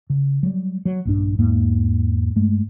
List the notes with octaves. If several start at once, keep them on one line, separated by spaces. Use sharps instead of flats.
C#3
F#3 G3
F#3
A#1 G2 D4
E2 G#2 A#3
G2 G#3 A3